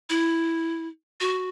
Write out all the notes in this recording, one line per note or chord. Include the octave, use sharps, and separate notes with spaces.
E4
F#4